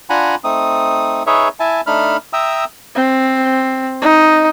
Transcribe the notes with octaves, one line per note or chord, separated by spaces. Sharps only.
D4 F4 F#5 G#5 A#5 B5
A3 C4 D#4 D#6
D#4 G#4 B4 C#5 E5
E4 E5 G#5 A5
A3 D4 D#4 B5 F6
E5 G5 A#5 D#6 E6
C4
D#4